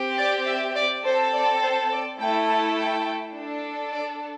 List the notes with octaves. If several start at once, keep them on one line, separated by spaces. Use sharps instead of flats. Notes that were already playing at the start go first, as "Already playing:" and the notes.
Already playing: C4 G4
D5
E5
D5
C4 A4 C5
D5
C5
D5
A3 E4 A4 G5
A5
G5
D4 A4
D5